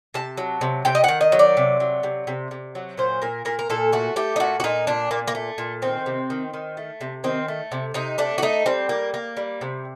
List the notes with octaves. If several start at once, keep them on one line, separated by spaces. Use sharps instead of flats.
C3 A5
F#3
C3
C3 G5
D#5
D#3 F#5
D#5
F#3
D5
C3
F#3
C3
C3
C3
F#3
A#2 C5
A#2 A#4
A#2 A#4
A#4
A#2 A4
A3 F#4
A3 G4
D#4
A#2 F#4
F#4
A#2 D#4
A#2 D4
A#2 A#3
A#3
A3
A#2
D#3 C4
C3
D#3
D#3
A3
C3
D#3 C4
A3
C3
C3 D#4
A3 D4
F#4
A3 D#4
G3 C4
A#3
A#3
G3
C3